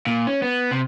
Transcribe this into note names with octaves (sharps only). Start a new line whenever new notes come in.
A#2
C#4
B3
C3